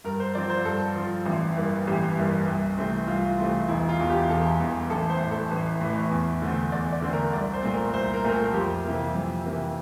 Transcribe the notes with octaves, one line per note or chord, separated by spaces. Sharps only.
G2 A#4
C5
F3 C4 D5
C5
G2 A4
F3 C4
A1
G2 E3 A#3
A1 G4
G2 E3 A#3
C2
C3 E3 A3 C4
C2 F4
C3 E3 A3 C4
E1 E4
F4
E2 E3
G4
E1 A4
E2 E3
A1 A4
C5
A2 E3
A4
A1
A2 E3
E2
D3 A3 C4
E2 D5
D5
D3 A3 C4
A#4
C2 D5
C5
A#2 A3 C4
A#4
C2 C5
A#4
A#2 A3 C4 A#4
A4
F2 G4
C3 E3 A#3
F2
C3 E3 A#3